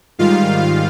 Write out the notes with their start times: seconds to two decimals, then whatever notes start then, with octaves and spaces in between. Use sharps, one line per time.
0.19 G#2 D#3 G3 F4 F5